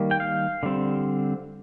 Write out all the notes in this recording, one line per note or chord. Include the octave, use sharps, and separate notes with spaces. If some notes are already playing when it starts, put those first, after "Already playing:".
Already playing: D#3 G3 A#3
G5
F5
D3 G3 C4